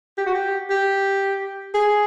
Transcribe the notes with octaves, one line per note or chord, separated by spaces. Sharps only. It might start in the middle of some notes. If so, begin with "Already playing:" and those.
G4
F#4
G4
G4
G#4